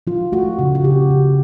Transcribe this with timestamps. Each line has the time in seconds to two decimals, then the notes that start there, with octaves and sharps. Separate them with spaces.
0.07 F3 F4
0.32 A3 F#4
0.59 C#3 F#4
0.75 F#4
0.84 C#3 G4
1.11 C#3